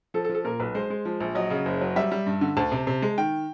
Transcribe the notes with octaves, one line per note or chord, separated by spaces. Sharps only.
F3 A4
A4
F3
A4
A#2 A#4
B1 B4
G#3 C5
G#3
F3
A#1
F#3 D#5
C#3
F#1
F#3
G3 E5
G3
G2
D3
D2 A5
C3
C3
G#3
D#3 G5